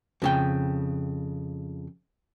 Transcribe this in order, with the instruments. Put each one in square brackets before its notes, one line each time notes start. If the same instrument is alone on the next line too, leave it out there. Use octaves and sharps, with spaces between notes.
[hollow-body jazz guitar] F2 C#3 G5